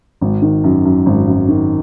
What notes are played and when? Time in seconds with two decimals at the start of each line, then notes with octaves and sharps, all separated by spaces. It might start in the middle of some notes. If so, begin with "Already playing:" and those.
0.21 G#1
0.42 D#3
0.64 F#2
0.85 F#2
1.06 G#1
1.27 F#2
1.48 D#3